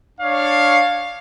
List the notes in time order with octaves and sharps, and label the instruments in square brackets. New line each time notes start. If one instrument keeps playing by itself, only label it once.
[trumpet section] D4 C#5 F5